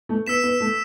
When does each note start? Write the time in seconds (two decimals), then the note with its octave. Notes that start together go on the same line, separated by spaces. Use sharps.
0.09 A3
0.27 B3 E6 B6 E7
0.44 B3
0.60 A3